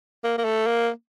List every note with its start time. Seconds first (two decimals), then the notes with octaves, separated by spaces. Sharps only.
0.24 A#3
0.38 A#3
0.45 A3
0.66 A#3